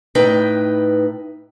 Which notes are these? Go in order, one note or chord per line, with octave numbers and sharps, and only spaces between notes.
A2 D#4 B4 G5